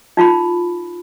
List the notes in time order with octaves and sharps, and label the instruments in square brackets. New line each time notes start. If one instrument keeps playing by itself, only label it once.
[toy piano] D#4 F4 A#5 B5